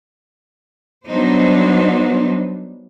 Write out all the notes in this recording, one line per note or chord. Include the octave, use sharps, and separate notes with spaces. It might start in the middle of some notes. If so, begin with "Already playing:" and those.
F#3 G3 B3 D4 D#4 C5